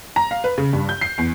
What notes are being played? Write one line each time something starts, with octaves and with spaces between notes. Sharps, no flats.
A#5
F5
B4
C#3
G2
G6
C7
E2